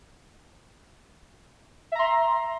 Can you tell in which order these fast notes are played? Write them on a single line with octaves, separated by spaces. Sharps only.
E5 A#5 C6